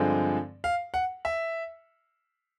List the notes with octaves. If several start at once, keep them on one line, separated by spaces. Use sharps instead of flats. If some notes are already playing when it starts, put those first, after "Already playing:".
Already playing: G2 D3 F3 G#3 C4
F5
F#5
E5